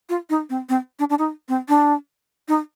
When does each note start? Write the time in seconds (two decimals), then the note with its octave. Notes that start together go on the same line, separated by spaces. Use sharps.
0.09 F4
0.30 D#4
0.50 C4
0.69 C4
0.99 D4
1.10 D4
1.18 D#4
1.49 C4
1.69 D4
2.48 D#4